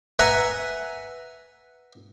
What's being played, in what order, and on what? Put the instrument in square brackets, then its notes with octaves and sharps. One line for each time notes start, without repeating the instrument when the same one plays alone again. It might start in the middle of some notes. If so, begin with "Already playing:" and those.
[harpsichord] B4 E5 F#5 G#5 A#5